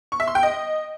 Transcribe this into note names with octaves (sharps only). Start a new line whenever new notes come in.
C#6
E5
C6
G5
D#5